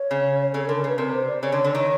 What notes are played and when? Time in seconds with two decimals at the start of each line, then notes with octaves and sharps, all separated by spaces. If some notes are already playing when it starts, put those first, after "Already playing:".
Already playing: C#5
0.11 C#3
0.54 C#3 A4
0.66 A#4
0.69 D3
0.76 A#4
0.84 C#3 B4
0.98 C3 A#4
1.13 C5
1.27 D5
1.42 C#3 C#5
1.52 D3
1.64 D3
1.75 D#3